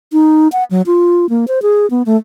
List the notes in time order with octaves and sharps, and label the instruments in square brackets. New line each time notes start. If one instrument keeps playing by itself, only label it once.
[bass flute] D#4
F#5
F#3
F4
A#3
C5
G#4
B3
A3